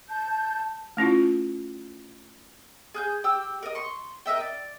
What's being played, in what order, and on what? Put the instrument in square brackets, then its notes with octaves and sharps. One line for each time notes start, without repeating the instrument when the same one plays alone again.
[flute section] A5 G6
[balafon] A3 C#4 E4 F4
[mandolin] G#4 F#6 G6
G4 G5 E6
A#4 D#5
C6 C#6
A#4 D#5 E5 G5
D5